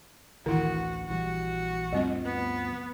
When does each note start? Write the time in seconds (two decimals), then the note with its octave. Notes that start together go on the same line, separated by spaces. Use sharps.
0.46 A1 D2 D#3 E3 E4 F#4 F#5
1.09 A#1 E3 G3 F#4
1.93 D2 G2 F3 G3 C4 D#5
2.25 B3